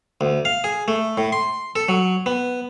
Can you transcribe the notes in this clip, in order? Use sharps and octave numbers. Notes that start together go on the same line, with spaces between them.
D2
F5
G#4
A3
A2
C6
A4
F#3
B3